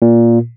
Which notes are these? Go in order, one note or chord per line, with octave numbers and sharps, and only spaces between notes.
A#2